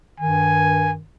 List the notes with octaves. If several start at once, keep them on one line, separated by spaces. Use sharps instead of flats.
G2 D#3 G#5